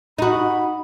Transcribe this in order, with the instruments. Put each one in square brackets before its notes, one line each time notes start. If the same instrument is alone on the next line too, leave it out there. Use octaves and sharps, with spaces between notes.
[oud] D#4 F#4 [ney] B5